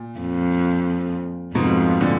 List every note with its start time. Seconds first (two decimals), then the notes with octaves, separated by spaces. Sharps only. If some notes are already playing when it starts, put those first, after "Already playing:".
Already playing: A#2
0.19 F2
1.55 F2 G#2 B2
2.01 A#2 D3